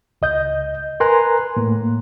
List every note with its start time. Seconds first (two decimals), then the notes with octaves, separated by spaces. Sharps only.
0.22 C#2 D#5 G6
1.00 A#4 B4 G#5 A#5 C6 F#6
1.57 A2 A#3